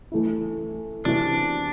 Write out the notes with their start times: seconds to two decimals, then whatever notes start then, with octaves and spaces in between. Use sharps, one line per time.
0.12 E3 A3 E4
1.05 C3 E3 B3 D4 F#4